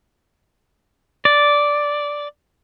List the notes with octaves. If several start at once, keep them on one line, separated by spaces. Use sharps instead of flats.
D5